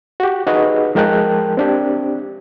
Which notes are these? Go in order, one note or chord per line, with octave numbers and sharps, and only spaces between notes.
F#4 G4
D#4 F#4 G#4 B4 D#5
F3 G#3 A#4 G5 A5 F#6
C4 D4 G4